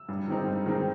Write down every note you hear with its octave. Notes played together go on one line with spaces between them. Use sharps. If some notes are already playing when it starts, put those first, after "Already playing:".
Already playing: E6
G2
D#3 G#3 C4 D#4
G2
D#3 G#3 C4 D#4